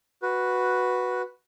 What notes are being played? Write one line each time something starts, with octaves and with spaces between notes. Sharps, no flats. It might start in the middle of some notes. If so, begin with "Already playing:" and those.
F#4 B4